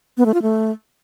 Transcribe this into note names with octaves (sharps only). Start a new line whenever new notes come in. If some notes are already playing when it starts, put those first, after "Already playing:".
B3
A3
F4
A3